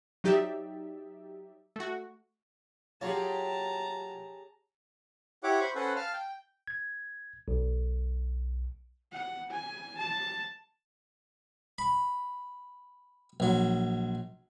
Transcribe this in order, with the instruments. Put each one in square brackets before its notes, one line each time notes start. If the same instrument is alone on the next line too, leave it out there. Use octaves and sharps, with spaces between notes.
[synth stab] F#3 D#4 G4 D5 E5
A3 F#4
[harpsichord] F#3 F4 [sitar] G4 G#4 C#5 [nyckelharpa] A5 A#5
[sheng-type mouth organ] E4 G4 C#5 F#5 D6
C5 B5 C#6
C#4 A4 B4 C5 F#5
F5 A5 F6
G5
[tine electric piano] G#6
B1
[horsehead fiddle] F#5
G#5
A5
[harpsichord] B5
A#1 F#3